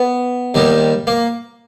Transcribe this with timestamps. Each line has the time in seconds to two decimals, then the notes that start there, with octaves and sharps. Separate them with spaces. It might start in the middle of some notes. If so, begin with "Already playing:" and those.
Already playing: B3
0.54 D#2 D#3 G3
1.07 A#3